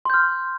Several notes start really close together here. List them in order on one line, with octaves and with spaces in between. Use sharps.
C6 G6 F6